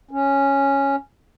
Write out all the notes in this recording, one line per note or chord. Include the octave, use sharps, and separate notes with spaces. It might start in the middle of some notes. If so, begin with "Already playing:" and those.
C#4